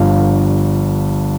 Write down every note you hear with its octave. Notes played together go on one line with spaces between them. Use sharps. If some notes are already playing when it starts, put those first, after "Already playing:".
Already playing: G1 G2 F3 F5